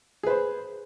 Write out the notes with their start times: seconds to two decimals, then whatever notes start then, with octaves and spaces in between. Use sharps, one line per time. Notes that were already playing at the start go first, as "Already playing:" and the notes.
0.23 G#4
0.27 B4
0.30 C5